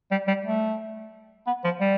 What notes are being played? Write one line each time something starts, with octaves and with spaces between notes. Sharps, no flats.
G3
G3
A3
B3
F3
G3